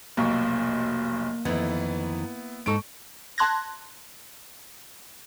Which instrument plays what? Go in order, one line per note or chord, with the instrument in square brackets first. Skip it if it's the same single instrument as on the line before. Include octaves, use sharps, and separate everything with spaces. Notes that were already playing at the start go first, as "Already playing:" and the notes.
[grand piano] F1 B1 C#6 [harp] A#3
[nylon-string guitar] F2 D#3 E3 [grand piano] B3 E4
[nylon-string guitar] G#2 D#4 A4 [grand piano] C#6 D7
[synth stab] A5 C6 F#6 G#6 A#6